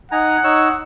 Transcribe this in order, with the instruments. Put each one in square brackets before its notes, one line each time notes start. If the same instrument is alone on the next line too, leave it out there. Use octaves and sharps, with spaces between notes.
[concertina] D#4 G#5 A#5 [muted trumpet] F#5
[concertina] D#4 C#5 E6